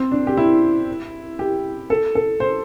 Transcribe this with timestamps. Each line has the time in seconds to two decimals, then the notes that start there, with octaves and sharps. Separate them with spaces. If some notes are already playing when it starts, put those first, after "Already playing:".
Already playing: C4
0.12 D4
0.27 G4
0.37 E4
1.39 G4
1.90 A4
2.15 A4
2.40 C5